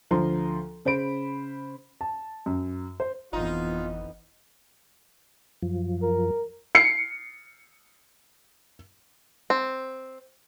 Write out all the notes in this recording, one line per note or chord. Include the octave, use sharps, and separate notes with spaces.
D2 F3 A#5 C6
C#3 C5 B5 D7
A5
F#2
C5
G1 F2 E3 B3 D#4 F4
F#2 F3
A#4
C7 C#7
C4